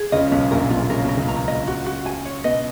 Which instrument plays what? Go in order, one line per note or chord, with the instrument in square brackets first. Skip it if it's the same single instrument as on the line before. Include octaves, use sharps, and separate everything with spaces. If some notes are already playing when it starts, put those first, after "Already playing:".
Already playing: [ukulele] G#4
[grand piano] C#2 C#3 [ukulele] D#5
[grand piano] B1 B2 [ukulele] C#4
[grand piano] A#1 A#2 [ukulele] A#4
[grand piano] B1 B2 [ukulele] F4
[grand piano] C#3 [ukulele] A#4
[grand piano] B2
[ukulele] A#4
[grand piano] C#2 C#3
[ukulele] A#5
D#5
F#4
F#4
G#5
C#5
[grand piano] B2 B3 [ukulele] D#5